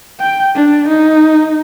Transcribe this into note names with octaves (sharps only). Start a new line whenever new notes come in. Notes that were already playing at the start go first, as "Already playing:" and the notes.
G5
D4
D#4